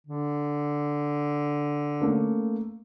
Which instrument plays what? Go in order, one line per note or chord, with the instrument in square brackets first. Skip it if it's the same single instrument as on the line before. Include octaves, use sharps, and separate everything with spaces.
[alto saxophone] D3
[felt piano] A3 A#3 C#4